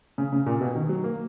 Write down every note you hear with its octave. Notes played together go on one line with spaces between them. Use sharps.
C#3
C#3
A#2
B2
D#3
F#3
A#3